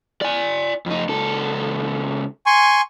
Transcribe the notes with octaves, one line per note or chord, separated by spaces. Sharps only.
D5 G#5
F2 D#4
C#2 A4
G#5 C6 C#6